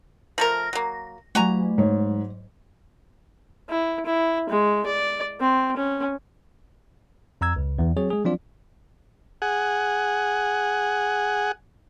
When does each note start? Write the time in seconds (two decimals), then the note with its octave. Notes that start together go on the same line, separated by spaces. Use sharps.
0.38 F3 A3 A#4 A#6
0.73 F#3 A#3
1.35 F#3 A3 F#4 G#5 A#5
1.78 G#2 C#5
3.70 E4
4.06 E4
4.50 G#3
4.86 D5
5.40 C4
5.77 C#4
7.41 F2 A#5 E6 G#6
7.56 C#2 C#3
7.79 E2 E3
7.97 F#3 C4 G#4 C#5
8.10 G#3 G#4
8.25 F3 F#3 C4 D4 F4 D5
9.42 G#4 F#5